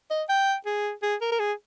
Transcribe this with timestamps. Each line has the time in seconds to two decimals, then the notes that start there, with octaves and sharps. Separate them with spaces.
0.10 D#5
0.29 G5
0.66 G#4
1.02 G#4
1.21 A#4
1.32 A#4
1.39 G#4